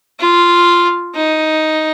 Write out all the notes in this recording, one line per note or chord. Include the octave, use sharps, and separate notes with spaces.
F4
D#4